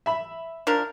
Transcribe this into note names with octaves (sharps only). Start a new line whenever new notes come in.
E5 B5
F3 D4 A#4